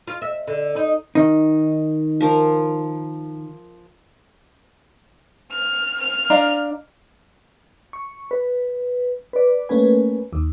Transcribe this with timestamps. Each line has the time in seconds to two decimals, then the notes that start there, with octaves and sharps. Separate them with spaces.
0.07 F4
0.22 E5
0.47 D3
0.76 D#4
1.15 D#3 D#4
2.20 F3 A#4
5.51 F6
5.99 F6
6.30 D4 F5 A#5
7.93 C#6
8.31 B4
9.33 B4 D5
9.69 A3 A#3 C#4 B4 G#5
10.33 D#2